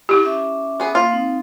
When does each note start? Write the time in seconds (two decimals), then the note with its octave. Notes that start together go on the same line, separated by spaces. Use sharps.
0.09 E4 G4
0.25 C#4 E5 D6
0.80 B3 G#4
0.95 A#3 F4
1.11 C4 D#4